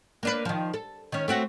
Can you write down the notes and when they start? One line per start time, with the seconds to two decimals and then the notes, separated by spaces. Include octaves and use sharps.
0.23 A#3 D4 B4
0.45 D#3 F3
0.74 A4
1.12 D#3 C#4
1.28 A3 C4 F#4